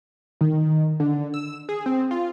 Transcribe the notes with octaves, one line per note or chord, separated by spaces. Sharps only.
D#3
D3
E6
G#4
C4
F4